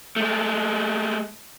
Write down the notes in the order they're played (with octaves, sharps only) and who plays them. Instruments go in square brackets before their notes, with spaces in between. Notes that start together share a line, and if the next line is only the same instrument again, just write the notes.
[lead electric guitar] G#3 A3